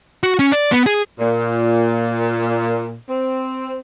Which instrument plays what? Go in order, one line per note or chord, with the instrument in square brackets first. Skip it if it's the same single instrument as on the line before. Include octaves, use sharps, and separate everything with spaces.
[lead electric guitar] F#4
C#4
D5
B3
G#4
[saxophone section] A#2
C4